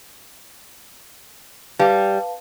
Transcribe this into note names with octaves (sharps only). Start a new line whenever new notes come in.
G3 G4 B4 F5 A5